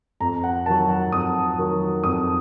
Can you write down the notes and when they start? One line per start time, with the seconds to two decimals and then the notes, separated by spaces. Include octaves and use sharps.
0.20 F2 A#5
0.44 F#5
0.66 D#3 F#3 A5
0.89 F#5
1.12 F2 D#6
1.58 D#3 F#3
2.04 F2 D#6